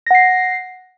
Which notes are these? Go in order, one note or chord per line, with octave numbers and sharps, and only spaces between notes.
F#5 A#6 C7